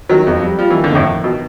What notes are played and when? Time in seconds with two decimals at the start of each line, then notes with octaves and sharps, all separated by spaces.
0.09 D#3 F#3
0.27 F2
0.43 G3
0.58 F3 G3
0.70 E3
0.75 D#3
0.84 D3
0.92 F2 A2
1.07 D#3
1.23 B2 D#3